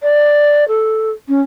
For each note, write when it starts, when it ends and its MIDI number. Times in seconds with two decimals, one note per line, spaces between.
0.02 0.67 74
0.68 1.10 69
1.28 1.40 61